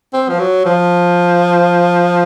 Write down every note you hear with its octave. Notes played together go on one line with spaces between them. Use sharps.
C4
F3
F#3
F3